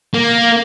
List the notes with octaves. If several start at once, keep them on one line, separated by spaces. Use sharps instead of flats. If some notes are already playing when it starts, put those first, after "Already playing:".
A#3